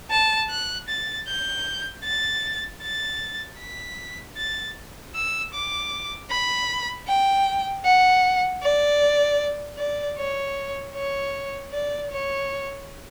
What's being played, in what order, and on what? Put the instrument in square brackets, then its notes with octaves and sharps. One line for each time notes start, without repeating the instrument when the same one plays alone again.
[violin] A5
F#6
A6
G6
A6
A6
B6
A6
E6
D6
B5
G5
F#5
D5
D5
C#5
C#5
D5
C#5